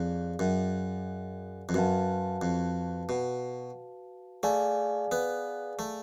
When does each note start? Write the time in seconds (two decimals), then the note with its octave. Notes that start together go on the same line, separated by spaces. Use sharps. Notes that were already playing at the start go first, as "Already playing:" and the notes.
Already playing: F2 G#4 D5 F5
0.39 F#2
1.69 F2
1.74 F#2 F#4 B4 F5 A5
2.42 F2
3.09 B2
4.43 A3 G#4 D5 F5 G#5
5.12 B3
5.79 A3